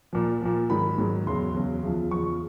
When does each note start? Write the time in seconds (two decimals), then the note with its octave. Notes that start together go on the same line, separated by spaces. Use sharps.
0.13 A#2 F3
0.42 A#2 F3
0.70 G#2 D#3 F#3 B5
0.98 G#2 D#3 F#3
1.26 E2 C#3 F#3 C6
1.54 E2 C#3 F#3
1.83 E2 C#3 F3
2.11 E2 C#3 F3 C#6